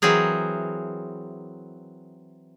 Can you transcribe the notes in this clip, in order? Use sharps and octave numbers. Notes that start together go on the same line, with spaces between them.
E3 F#3 C4 G#4 A#4